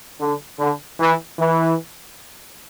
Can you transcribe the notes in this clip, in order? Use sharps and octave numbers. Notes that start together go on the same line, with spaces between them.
D3
D3
E3
E3